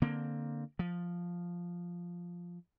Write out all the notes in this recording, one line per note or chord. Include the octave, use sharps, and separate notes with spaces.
D3 A#3 C4
F3